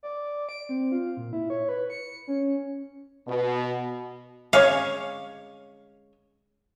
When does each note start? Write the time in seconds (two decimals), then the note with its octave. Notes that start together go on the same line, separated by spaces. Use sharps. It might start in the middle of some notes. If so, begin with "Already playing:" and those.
0.03 D5
0.49 D7
0.69 C4
0.92 F4
1.17 A#2
1.33 E4
1.50 C#5
1.69 B4
1.90 C#7
2.28 C#4
3.28 B2
4.53 G#3 C#4 C#5 F5